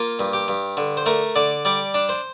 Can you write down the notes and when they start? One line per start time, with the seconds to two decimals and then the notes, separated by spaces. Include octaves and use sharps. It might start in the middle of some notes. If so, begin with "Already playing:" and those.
Already playing: A#3 F4
0.19 G2
0.33 G4
0.48 G2
0.77 D3
0.97 C5
1.06 A3 A#4
1.36 D3 D5
1.65 G3 D5
1.94 D4
2.09 C5